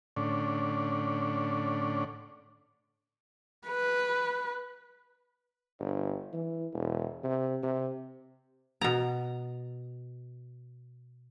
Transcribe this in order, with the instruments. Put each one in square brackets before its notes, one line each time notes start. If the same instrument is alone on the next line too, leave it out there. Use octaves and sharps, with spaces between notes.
[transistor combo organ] A2 D3 C#4 D4
[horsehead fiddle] B4
[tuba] G1
E3
E1
C3
C3
[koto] B2 A#5